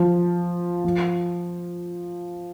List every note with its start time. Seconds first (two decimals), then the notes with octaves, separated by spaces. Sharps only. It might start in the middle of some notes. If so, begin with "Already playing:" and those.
Already playing: F3
0.84 F3